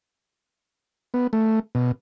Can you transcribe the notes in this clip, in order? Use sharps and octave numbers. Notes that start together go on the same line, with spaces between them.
B3
A3
B2